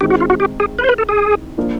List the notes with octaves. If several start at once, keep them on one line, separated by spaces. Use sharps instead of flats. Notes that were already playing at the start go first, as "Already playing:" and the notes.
D#3 G#3 C4 E4 G4
F#4
F4
F#4
G4
G#4
B4
C5
B4
A4
G#4
F3 A#3 D4 F4